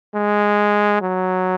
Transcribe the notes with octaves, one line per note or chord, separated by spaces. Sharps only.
G#3
F#3